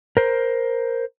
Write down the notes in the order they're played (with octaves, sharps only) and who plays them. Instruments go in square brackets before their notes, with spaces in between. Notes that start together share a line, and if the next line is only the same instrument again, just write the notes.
[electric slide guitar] A#4 C5